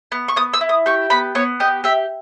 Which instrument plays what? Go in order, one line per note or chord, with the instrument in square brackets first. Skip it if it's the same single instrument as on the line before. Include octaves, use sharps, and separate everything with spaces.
[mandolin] B3
C#6
B3 D#6
E6
E4
D#6
G4 C#6
B3 B5
B3 C#5
G4 D#5
G4 E5